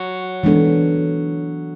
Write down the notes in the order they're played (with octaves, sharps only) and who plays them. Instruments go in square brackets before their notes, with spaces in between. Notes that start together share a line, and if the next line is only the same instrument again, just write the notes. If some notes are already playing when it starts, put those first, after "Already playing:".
Already playing: [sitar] F#3
[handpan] E3 G#3 B3 D4 A4